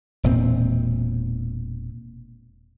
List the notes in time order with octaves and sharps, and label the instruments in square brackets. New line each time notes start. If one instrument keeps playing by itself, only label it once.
[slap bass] E1 A#2 C4